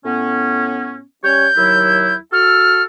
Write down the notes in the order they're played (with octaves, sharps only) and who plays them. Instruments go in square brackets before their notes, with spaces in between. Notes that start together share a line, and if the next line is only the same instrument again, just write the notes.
[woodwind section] A2 B3 C#4
[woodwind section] G3 C#4 C#5 [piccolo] G6
[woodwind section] D#2 F#3 E4
[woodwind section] F#4 A4 [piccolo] F6